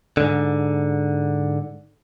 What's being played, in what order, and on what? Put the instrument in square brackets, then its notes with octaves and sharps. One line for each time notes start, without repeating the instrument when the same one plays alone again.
[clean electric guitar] G#2 D3